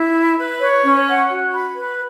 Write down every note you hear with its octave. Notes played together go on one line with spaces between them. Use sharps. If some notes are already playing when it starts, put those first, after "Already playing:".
Already playing: E4
B5
B4
C#5
C#4
F#5
F#4
B5
B4